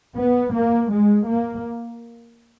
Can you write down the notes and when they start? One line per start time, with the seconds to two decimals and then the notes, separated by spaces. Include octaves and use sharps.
0.16 B3
0.53 A#3
0.90 G#3
1.28 A#3